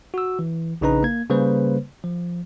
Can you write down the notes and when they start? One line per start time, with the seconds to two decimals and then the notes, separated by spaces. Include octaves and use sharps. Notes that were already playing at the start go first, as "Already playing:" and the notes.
0.14 F#4 E6
0.39 E3
0.81 A#1 C#3 D4 D#4 B4 A#5
1.03 A#3 G#6
1.30 C#3 G3 A#3 B4 C5
2.04 F3